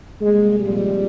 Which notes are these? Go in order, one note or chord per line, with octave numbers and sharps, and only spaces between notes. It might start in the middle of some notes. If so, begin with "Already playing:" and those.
C3 G3 G#3 A#3
A#2 F3 G3 G#3 C4